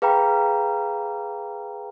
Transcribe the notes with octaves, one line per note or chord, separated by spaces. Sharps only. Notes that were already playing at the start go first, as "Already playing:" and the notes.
G#4 B4 F5 G5 A#5 B5